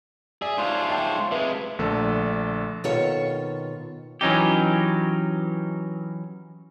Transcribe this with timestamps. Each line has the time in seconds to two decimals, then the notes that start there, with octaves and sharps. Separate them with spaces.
0.42 G#4 D5 E5
0.57 G#2 D4 F4 C5 C#5
0.89 E5 G5 A5
1.32 C3 G#3 B4 E5
1.79 A#1 D3 A3 A4
2.84 D#2 B2 D#3 F4 A4 C#5
4.21 E3 F#3 C#4 D#4 G4